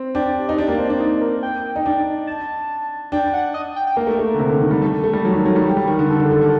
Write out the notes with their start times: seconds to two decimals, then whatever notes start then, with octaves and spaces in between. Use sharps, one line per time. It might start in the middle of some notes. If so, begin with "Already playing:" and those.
Already playing: C4
0.15 D4 G4
0.49 D#4
0.58 D4
0.68 A#3
0.78 C4
0.90 D4
1.00 D#4
1.21 A#4
1.43 G5
1.76 D#4
1.86 D4
2.27 A5
3.12 D4 G5
3.33 F#5
3.54 D#5
3.76 G5
3.87 G5
3.96 A#3 A#4
4.07 A3
4.19 A3
4.34 D3
4.39 C3
4.50 D3
4.60 D#3
4.71 G3
4.82 A3 A4
5.04 A3
5.13 G3
5.25 F#3
5.35 D#3
5.46 F#3
5.56 G3
5.66 G4
5.77 G3
5.87 D#3
5.99 D3
6.10 A4
6.20 D3
6.31 D3
6.42 D#3